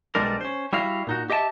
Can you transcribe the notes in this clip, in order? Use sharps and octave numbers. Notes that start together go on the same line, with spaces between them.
B1 G3 G#3 D4 A#4
C#4 C5
G3 E4 F#4 F5
A#2 D#4 F#4
G4 D#5 E5 G5 A5